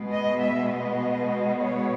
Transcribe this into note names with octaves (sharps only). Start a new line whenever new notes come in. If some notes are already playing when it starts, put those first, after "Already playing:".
Already playing: B2 G#3 B3
D#5
E5
D#5
C#5